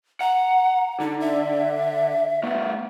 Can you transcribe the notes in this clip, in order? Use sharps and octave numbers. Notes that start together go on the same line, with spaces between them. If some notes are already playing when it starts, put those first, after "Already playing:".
F#5 A#5
D3 D#4
E5
A3 B3